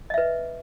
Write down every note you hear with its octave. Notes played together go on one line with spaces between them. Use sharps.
B4 D#5 E5